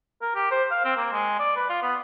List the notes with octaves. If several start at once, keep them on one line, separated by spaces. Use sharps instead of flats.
A#4
G4
C5
F5
C4
A#3
G#3
D5
B4
F4
B3